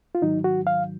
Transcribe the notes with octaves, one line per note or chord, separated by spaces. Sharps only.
F4
G#2 D#3 F#3 D#4
F#4
F5